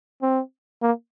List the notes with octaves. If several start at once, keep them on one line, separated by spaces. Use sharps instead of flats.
C4
A#3